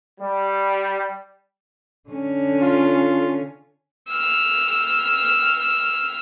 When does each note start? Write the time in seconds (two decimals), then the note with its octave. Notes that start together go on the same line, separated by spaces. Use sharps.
0.20 G3
2.09 D3 C#4
2.62 F4
4.09 E6 F6